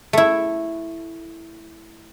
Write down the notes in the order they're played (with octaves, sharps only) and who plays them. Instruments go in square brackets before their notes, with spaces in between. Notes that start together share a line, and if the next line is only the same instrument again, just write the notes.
[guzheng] A3 E4